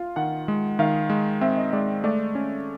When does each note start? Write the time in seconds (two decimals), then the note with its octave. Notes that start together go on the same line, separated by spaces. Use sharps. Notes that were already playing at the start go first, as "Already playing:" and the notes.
Already playing: F4 F5
0.16 D#3 F#5
0.48 G#3
0.79 D#3 F5
1.10 G#3
1.41 C4 E5
1.57 D#5
1.73 G#3 D5
2.04 A3 D5
2.35 C#4